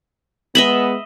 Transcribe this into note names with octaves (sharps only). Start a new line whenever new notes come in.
G#3 B3 D#5 E5 B5